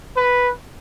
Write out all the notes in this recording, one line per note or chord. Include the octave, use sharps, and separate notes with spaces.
B4